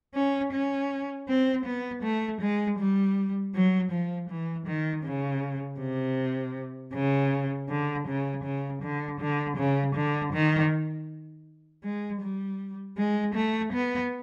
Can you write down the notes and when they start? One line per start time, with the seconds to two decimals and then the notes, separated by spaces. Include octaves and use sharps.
0.15 C#4
0.52 C#4
1.28 C4
1.65 B3
2.02 A3
2.41 G#3
2.79 G3
3.54 F#3
3.91 F3
4.29 E3
4.66 D#3
5.04 C#3
5.79 C3
6.93 C#3
7.69 D3
8.07 C#3
8.43 C#3
8.82 D3
9.20 D3
9.57 C#3
9.95 D3
10.33 D#3
11.84 G#3
12.21 G3
12.97 G#3
13.35 A3
13.72 B3